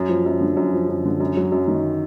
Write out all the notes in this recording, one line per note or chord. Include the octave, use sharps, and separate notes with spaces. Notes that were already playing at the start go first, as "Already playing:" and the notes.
Already playing: F#2
F3
F#2
D3
F#2
F3
F#2
D3
F#2
F#3
F#2
D#3